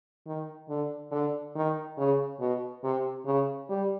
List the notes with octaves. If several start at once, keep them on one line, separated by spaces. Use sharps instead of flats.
D#3
D3
D3
D#3
C#3
B2
C3
C#3
G3